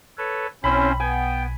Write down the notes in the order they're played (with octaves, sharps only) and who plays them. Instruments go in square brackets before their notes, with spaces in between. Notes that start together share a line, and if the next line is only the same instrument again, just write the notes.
[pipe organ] A4 B4 C#5
[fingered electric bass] B1 [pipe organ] C4 E4 C5 [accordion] C#4 [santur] B5
[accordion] B3 [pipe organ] G5 [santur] G#5